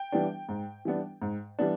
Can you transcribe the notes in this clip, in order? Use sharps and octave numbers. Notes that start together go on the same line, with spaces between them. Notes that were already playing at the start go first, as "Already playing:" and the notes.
Already playing: G5
E3 G3 B3 D4
G#2
E3 G3 B3 D4
G#2
E3 G3 B3 D4